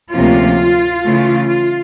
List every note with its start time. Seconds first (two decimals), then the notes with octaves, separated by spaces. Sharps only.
0.11 D2 C3 F3 A#3 C#4 F4
1.02 C#3 E3 A3
1.47 F4